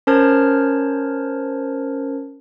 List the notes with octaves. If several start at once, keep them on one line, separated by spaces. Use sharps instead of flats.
C#4 A#4 C5 A5 F6 G#6